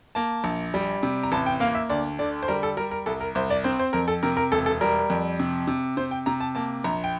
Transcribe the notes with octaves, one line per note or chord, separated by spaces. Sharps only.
A#3 A5
A#1
G3
C3
A#5
A1 A5
G5
A#3 F5
E5
D2 D5
D3 D5
C5
G3 A#4
A4
G3 A#4
A#4
C2 A4
A#4
C2 C5
D5
C4 C5
C5
F2 A#4
A4
C3 A#4
A#4
E1 A4
A4
G3 A#4
F2
C3
C3
C3 C5
G5
C3 A#5
A5
A#3 A5
A#1 A#5
G5